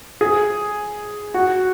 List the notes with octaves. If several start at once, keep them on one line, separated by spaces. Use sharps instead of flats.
G#4
F#4